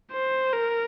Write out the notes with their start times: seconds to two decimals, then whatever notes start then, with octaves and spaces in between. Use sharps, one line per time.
0.12 C5
0.53 A#4